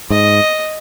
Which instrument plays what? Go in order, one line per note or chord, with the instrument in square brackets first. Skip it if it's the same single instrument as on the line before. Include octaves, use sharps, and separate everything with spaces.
[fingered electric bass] G#2 [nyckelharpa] D#5